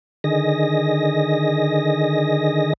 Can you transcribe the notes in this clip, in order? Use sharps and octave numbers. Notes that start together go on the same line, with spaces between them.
D3 D#3 G#4 D#5 A#6